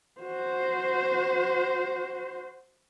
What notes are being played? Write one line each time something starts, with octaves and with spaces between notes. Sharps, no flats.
F#4 C5